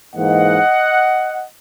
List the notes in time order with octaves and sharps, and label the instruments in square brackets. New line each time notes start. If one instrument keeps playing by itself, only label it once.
[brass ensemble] G#2 E3 A#3 D#5 F#5